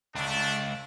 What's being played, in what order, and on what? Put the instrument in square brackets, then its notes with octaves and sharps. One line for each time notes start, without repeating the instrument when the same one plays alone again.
[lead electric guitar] C#2 [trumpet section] A3 D4